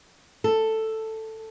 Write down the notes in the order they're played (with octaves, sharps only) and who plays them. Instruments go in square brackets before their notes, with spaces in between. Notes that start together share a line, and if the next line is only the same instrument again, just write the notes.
[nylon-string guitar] A4